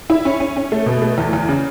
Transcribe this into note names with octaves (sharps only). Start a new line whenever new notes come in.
E4
C#4
C#4
C#4
A3
B2
A3
E2
E2
C#3